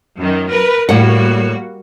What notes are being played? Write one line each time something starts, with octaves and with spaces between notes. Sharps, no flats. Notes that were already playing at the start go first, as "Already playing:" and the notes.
F#2 D#3
A#4 B4
A2 G3 A#3 F#4 F#5